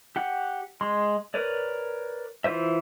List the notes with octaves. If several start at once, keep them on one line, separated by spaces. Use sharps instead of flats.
G4 F#5
G#3 C6
A#4 B4 C#5 D5
E3 F4 B4 C5 E5